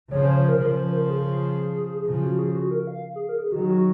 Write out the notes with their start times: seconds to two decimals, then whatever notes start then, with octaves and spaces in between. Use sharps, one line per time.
0.11 C#3 F3 C#5
0.24 C5
0.36 C5
0.48 A#4
0.60 C#3 F3 A#4
0.77 C5
0.93 A#4
1.10 G#4
2.06 C#3 F3
2.23 F#4
2.39 G#4
2.55 F#4
2.71 A#4
2.87 F5
3.16 G#4
3.29 A#4
3.41 G#4
3.52 D#3 F#3 F#4
3.68 F#4